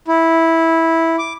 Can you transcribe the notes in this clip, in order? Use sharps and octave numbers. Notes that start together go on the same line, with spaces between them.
E4
D6